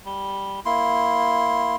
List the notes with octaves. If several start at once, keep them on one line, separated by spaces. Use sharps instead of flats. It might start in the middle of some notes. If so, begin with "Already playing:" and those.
G3
A#3 E4 C6